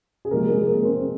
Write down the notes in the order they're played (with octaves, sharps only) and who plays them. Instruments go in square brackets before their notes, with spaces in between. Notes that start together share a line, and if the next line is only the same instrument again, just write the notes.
[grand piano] G#4
C3 F3 G#3 A#3 A#4
G#3 G#4
A#3 A#4
C4 C5